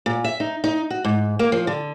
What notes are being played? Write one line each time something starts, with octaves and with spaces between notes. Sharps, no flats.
A#2
E5
D#4
D#4
F#4
G#2
A#3
F3
D3